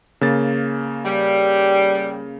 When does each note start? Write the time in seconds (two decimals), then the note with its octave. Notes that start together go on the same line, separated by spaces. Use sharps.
0.21 C#3 A#3 A6
1.05 G3